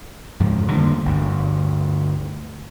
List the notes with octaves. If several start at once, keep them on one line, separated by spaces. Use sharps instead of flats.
F2 G#2 C#3 F3
D3 G3 A3 A#3
G1 D2